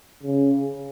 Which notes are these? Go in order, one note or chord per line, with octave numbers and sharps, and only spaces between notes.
C#3